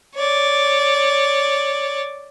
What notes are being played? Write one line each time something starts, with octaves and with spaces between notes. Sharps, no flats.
C#5 D5